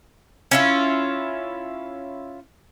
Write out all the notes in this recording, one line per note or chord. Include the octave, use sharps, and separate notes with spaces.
C#4 E4 F4